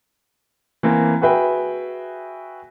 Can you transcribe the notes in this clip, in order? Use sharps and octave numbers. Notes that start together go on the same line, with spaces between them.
E3 A#3 C4
F#4 G#4 B4 E5 G5